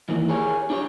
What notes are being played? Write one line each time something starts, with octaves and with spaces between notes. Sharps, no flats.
D#3 E3 A#3
G4 G#4 A#4 C#5
D4 G4 C#5